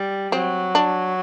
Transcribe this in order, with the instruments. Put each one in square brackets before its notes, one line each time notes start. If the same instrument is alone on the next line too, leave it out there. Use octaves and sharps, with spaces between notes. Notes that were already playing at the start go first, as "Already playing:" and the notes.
Already playing: [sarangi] G3
[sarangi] F#3 [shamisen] C4
[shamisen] D4